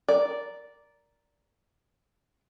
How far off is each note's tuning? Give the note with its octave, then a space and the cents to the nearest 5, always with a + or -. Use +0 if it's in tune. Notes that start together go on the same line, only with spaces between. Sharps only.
A#4 +0 D5 -10